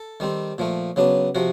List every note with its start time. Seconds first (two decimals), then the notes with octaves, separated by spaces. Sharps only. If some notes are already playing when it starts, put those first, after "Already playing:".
Already playing: A4
0.20 D#3 G3 C4
0.58 A#2 F3 A3
0.96 C#3 F#3 B3 D4
1.35 C3 F3 F#4